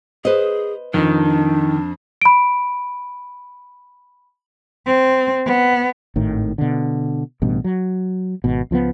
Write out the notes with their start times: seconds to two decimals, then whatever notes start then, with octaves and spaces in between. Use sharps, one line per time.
0.25 G#4 B4 C5 D#5
0.94 F2 D#3 D4
2.22 B5 D7
4.86 C4
5.45 B3
6.16 G#1 A2 D#3
6.58 B2 D3
7.42 A1 G2 B2
7.64 F#3
8.44 G#1 B2
8.71 C#2 F3 G#3 B3